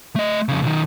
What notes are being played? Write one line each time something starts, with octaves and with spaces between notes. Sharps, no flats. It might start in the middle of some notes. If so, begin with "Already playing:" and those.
A3 D#5
F2 C#3
B1 D#3